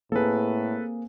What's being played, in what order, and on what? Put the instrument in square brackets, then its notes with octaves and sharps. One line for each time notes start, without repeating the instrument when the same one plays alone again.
[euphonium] A2 [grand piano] A#3 C4 G#4 [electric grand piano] A4 B4